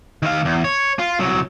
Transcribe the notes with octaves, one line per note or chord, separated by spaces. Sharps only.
D#3 F5
E2
C#5
F4
C2 F#3